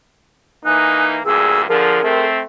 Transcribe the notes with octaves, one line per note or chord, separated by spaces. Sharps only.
E3 A#3 D#4 G#5 D#6 F#6
D2 G2 A#2 G#4 E6
D3 F3 G#4 A#4
A3 C4